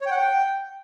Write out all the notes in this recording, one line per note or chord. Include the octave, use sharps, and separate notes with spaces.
C#5
G5
F#5
G5